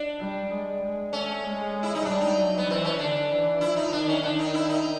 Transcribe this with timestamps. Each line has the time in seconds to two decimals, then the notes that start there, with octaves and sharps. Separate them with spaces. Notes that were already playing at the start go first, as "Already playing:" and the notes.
Already playing: D4
0.19 G3
0.50 G#3
0.82 G#3
1.12 A3 C#4
1.43 G#3
1.83 E4
1.95 D#4
2.05 G3 D4
2.21 D#4
2.37 F#3
2.58 B3
2.68 E3 C4
2.85 C#4
2.99 D3 D4
3.30 E3
3.61 F3 E4
3.76 D#4
3.92 D#3 D4
4.08 C#4
4.23 D#3 D4
4.39 D#4
4.54 E4
4.69 D#4